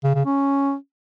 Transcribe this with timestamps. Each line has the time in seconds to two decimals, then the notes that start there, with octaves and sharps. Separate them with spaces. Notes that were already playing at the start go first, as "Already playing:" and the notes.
0.04 C#3
0.15 C#3
0.25 C#4